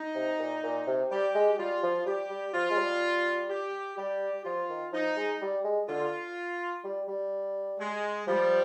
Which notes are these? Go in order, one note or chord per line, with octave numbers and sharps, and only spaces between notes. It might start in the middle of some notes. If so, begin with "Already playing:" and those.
Already playing: D#4
C3
A#2
A#2
C3
G3 G4
G#3
G3 F4
F3
G3 G4
G3
F3 F4
G#3
G3
G4
G3 G4
F3 F4
D#3
F3 D#4
G#3
G3
G#3
D3 F4
G3
G3
G#3
F3 G3